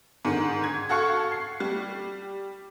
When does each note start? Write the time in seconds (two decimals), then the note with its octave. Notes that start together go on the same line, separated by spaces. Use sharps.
0.25 G#2 D3 D#3
0.64 G#6
0.89 F#4 A4 F5 C#6
1.32 C7
1.60 G3